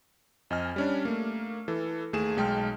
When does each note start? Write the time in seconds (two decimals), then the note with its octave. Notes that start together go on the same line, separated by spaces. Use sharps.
0.50 F2 D#5 G#5 F6
0.76 G3 C#4 D4
1.05 A3 A#3
1.68 E3 A4
2.13 D#2 A3 G#4 E7
2.37 B1 G#3 G5 A5 F6